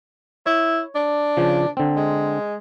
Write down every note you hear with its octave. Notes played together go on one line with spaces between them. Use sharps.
E4 C#5
D4
C#3 F3
D3 C4
G#3